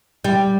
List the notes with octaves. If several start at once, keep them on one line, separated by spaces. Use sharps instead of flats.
G3